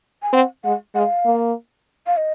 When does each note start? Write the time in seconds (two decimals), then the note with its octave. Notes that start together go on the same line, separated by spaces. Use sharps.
0.22 G#5
0.33 C4 F#5
0.64 G#3 F#5
0.95 G#3 F5 F#5
1.25 A#3
2.06 F5
2.17 D#5